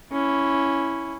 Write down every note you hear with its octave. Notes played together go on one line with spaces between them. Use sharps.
C#4 E4